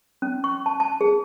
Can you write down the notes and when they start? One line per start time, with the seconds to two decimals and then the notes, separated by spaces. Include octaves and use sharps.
0.22 C#4
0.44 C#6
0.66 A5
0.80 A5
1.01 G#4